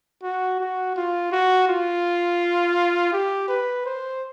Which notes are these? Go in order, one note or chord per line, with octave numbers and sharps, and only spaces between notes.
F#4
F#4
F4
F#4
F4
G4
B4
C5